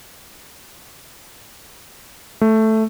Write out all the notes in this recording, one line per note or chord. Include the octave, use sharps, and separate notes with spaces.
A3